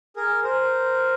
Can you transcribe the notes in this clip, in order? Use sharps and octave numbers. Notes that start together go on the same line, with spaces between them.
G#4 A#4
A#4 C5